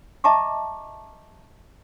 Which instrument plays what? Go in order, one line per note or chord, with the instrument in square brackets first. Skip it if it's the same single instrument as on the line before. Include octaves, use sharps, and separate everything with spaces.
[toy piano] D#5 E5 A5 A#5 C#6 D6